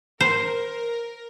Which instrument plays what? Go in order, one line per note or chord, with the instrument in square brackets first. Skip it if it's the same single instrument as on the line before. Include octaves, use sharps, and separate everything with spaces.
[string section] A#4 [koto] C5